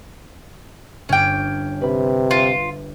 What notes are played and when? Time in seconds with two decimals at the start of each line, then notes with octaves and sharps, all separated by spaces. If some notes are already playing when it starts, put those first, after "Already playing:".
1.09 G1 C#4 G5 D6
1.81 C3 B4 B5
2.31 F4